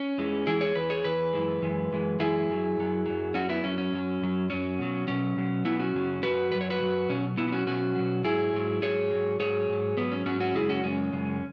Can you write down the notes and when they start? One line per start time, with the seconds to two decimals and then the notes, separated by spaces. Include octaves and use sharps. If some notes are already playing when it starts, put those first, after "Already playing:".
Already playing: C#4
0.18 E2 E3 G#3
0.47 E2 E3 G#3 E4 G#4
0.61 G#4 C#5
0.75 E2 E3 B4
0.90 G#4 C#5
1.04 E2 E3 B4
1.33 F#2 E3 G#3
1.62 F#2 E3 G#3
1.91 F#2 E3 G#3
2.19 F#2 E3 G#3 E4 G#4
2.49 F#2 F#3
2.77 F#2 F#3
3.06 F#2 F#3
3.34 F#2 F#3 C#4 F#4
3.49 B3 E4
3.64 F#2 F#3 C#4
3.78 C#4
3.92 F#2 F#3
4.21 F#2 F#3
4.50 F#2 F#3 C#4
4.79 B2 F#3
5.07 B2 F#3 C#4
5.36 B2 F#3
5.65 B2 F#3 B3 E4
5.79 C#4 F#4
5.94 F#2 C#3 F#3
6.23 F#2 C#3 F#3 F#4 B4
6.52 F#2 C#3 F#3 B4
6.61 C#5
6.70 F#4 B4
6.80 F#2 C#3 F#3
7.09 B2 F#3 C#4
7.37 B2 F#3 B3 E4
7.48 E4
7.52 C#4 F#4
7.67 B2 F#3 C#4 F#4
7.96 B2 F#3
8.24 G#2 F#3 E4 G#4
8.53 G#2 F#3
8.82 G#2 F#3 G#4 C#5
9.11 G#2 F#3
9.40 G#2 F#3 G#4 C#5
9.69 G#2 F#3
9.97 G#2 F#3 B3
10.12 C#4
10.26 G#2 F#3 C#4 F#4
10.40 C#4 F#4
10.55 F#2 C#3 G#3 E4 G#4
10.69 C#4 F#4
10.84 F#2 C#3 G#3 C#4
11.13 F#2 C#3 G#3